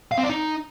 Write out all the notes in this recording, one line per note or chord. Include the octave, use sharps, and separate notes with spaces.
F5
C4
D5
D#4